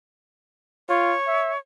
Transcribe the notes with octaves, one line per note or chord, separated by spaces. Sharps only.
F4 C#5
E5